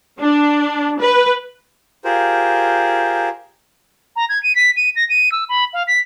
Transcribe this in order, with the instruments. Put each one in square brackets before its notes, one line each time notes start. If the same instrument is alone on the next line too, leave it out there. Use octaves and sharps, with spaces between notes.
[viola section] D4
B4
[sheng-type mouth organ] F4 G4 G#4 A#4 C5
[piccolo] A#5
G#6
D#7
B6
D#7
A#6
D#7
E6
B5
F5
B6